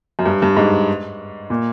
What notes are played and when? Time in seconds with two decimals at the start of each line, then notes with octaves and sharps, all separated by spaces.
0.19 F#2
0.26 G2
0.42 G2
0.57 G#2
1.50 A#2